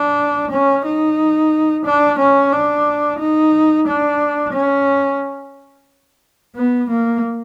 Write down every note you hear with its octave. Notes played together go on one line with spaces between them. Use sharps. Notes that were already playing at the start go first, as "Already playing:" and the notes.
Already playing: D4
C#4
D#4
D4
C#4
D4
D#4
D4
C#4
B3
A#3